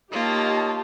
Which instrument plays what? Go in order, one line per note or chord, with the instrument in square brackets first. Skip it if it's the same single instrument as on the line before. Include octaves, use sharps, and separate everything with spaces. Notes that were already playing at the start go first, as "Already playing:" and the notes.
[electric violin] A#3 [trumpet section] D#4 C#5 D#5 [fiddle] F4 [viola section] G4 A5